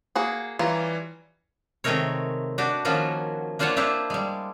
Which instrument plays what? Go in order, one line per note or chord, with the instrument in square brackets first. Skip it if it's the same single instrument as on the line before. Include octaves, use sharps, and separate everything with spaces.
[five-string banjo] A#3 F#4 G#4
[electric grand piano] E3 A#5 [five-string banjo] G3 C#4 F4
[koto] C3 D#3 G#3 A3 A#4 C#5
D4 F#4 G4
D#3 F3 A#3 C#4 F4 F#4
A#3 D4 F4 C5 C#5 F#5
D4 E4 F4 G4 C5
G3 G#3